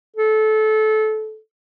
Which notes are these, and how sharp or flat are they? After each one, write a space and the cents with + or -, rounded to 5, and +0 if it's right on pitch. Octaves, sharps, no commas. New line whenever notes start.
A4 -25